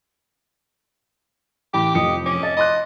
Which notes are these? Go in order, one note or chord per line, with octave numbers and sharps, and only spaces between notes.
A1 G4 B5 D6
F1 F3 D#5 C#7
C#4 D6
D#5 A5
D#5 B5 C6 F#6